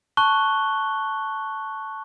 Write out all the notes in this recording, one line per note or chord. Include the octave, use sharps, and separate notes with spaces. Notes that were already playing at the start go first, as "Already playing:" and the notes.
A5 C#6 F#6 G7